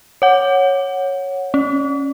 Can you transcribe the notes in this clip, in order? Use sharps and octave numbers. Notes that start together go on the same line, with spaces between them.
C#5 F#5
C#4